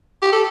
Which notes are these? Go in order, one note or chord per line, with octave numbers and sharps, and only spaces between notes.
G4
A4